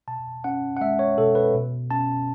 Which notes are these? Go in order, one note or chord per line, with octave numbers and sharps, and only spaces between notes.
B2 A5
C#4 F#5
F#5
G#3 E5
C#5
B2 A4
B4
B2
C#4 A5